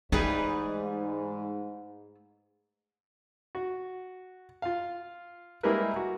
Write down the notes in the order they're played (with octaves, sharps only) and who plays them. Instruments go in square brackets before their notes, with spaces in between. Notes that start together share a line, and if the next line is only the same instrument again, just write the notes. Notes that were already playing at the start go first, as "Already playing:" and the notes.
[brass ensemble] G#2 [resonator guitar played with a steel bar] E3 G3 G#4 [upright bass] A3 [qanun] D#4 B4
[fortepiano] F#4
F4 F5
G3 G#3 A#3 E4 A#4 B4
F#4